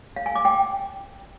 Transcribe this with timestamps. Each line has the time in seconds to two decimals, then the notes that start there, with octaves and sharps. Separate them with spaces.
0.16 F5
0.26 G#5
0.35 D6
0.45 G5